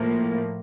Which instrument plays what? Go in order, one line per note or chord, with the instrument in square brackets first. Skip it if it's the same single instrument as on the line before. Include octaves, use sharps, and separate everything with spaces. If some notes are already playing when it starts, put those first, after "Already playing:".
Already playing: [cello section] A2 F3 A#3